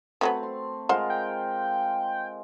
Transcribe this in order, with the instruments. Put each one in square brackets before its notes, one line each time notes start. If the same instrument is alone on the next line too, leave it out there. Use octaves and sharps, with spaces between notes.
[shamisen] F3 F#3 B3 [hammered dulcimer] A3 C4
[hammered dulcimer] C6
[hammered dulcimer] G#3 F4 A#4 [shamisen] C5 F#5
[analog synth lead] G5